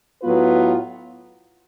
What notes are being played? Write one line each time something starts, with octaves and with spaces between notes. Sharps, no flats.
A2 F#3 B3 F4 B4